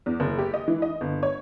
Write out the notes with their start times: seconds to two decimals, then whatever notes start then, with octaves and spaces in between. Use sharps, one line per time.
0.06 E2
0.20 F#1
0.38 G4
0.54 D#5
0.68 E3
0.82 D#5
1.01 G1
1.23 C#5